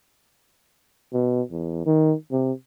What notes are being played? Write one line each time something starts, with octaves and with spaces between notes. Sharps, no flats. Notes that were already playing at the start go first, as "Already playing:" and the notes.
B2
E2
D#3
C3